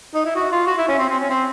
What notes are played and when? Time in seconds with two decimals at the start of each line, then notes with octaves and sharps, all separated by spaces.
0.14 D#4
0.25 E4
0.35 F#4
0.52 F4
0.67 F#4
0.78 E4
0.88 C#4
0.99 C4
1.09 C4
1.20 C#4
1.30 C4